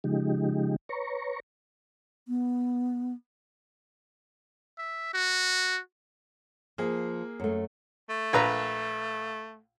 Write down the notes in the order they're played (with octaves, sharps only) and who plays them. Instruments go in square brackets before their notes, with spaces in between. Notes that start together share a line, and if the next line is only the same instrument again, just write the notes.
[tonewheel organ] C#3 F3 G#3 D#4 G4
B4 C#5 A#5 C#6
[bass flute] B3
[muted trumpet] E5
F#4
[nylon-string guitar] F3 [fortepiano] A#3 G#4
[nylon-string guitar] F#2 A3
[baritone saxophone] A3
[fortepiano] A#1 B4 A#5